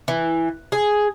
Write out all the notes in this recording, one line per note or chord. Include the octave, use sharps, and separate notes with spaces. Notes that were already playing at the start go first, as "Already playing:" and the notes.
E3
G#4